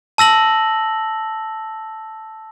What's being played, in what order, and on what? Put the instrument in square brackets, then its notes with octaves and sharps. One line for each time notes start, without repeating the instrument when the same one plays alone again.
[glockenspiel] A5 E6 A#6 F#7